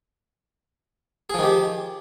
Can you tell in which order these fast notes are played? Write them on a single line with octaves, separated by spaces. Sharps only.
G#4 F3 D#3 G4